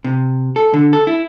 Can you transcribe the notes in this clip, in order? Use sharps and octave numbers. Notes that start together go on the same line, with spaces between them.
C3
A4
D3
A4
E4